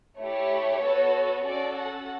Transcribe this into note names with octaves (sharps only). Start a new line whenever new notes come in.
A3 E4 G4 C#5
B3 F#4 A4
C#4 F#4 A4 D5
F#5